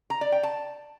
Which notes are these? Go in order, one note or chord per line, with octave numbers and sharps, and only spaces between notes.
A#5
D5
G5
A5